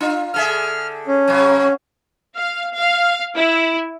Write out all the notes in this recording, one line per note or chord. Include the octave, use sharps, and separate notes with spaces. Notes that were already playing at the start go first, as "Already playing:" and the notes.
D4 F4
D3 G#4 E5 F6
C#4
C3 F#3
F5
F5
E4